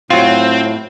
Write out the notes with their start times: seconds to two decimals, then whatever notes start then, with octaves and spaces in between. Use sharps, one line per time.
0.10 A2 F#3 C4 F4